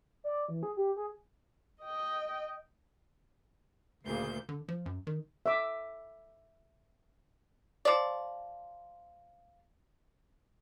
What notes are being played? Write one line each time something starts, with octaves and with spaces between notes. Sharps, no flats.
D5
E3
G#4
G4
G#4
D#5 G5
D2 A#2 C#3 G6
D3
F3
F#2
D#3
E5 D6
F3 D5